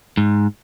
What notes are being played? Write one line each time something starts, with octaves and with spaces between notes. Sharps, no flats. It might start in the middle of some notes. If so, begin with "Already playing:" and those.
G#2